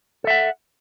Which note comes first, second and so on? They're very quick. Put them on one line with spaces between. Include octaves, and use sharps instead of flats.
A4 E5 F#5